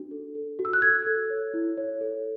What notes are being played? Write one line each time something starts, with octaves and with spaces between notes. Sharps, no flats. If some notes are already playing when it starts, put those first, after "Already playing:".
Already playing: D4 F#4
A4
A4
F#4
E6
F#6
A4 G#6
A4
C#5
E4
C#5
A4